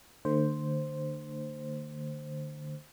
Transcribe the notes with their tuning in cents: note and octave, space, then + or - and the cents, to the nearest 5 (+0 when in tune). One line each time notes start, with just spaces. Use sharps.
D3 +35 A3 +40 C5 +0